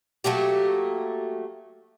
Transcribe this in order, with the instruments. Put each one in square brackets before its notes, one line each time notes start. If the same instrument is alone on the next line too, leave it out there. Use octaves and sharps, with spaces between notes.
[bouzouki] F#3 A3 A#3 G4